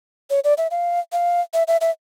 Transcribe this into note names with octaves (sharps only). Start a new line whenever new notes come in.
C#5
D5
E5
F5
F5
E5
E5
E5